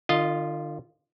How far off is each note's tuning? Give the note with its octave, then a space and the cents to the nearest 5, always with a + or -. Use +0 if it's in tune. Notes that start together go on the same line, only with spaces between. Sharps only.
D3 +45 F4 -5 D#5 -5